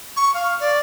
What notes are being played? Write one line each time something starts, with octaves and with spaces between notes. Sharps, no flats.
C#6
F5
D5